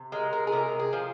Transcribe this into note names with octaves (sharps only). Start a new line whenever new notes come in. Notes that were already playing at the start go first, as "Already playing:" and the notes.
Already playing: C3
G#3 A#4
A#4
G#4
C3 A#4
G#4
F3